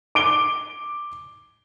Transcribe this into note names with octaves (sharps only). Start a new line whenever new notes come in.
D6 D7 G7